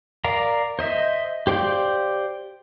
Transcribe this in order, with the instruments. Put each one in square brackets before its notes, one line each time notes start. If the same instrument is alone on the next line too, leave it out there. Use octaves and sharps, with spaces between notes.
[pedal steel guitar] A#4 D5 F5 A#5
C5 D#5 E5
G4 C5 D5 F5 G6